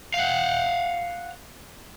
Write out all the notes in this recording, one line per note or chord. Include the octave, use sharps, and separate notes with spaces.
F5 F#5